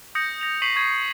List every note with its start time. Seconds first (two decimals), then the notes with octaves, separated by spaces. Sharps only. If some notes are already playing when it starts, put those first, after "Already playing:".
0.15 D#6 G6 A#6 C#7
0.41 A#6 F7
0.62 C#6 B6 C7 D#7 F#7
0.76 C#6 G#6 C7